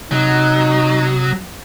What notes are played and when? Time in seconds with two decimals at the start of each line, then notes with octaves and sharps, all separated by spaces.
0.11 C3 F#3 D#4 D#6